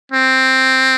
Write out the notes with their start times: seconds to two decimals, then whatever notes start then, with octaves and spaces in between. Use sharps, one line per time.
0.12 C4